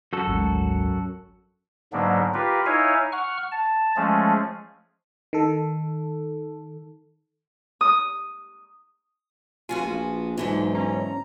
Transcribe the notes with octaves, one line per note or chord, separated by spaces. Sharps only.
F#2 F#4 A4
G#1 D2 G#2
G#2 D3 F#3 A#3 B3 D4
F4 G4 A#4 B4
D#4 E4 C#5 F5 G#5
F#5 C#6 F6
A5
F3 G#3 A3 C#4 G#4
D#3 A4
D#6
F1 B3 F4 F#4 G#5
A#1
B1 G#2 D3 E3 D#4
C#4 A#5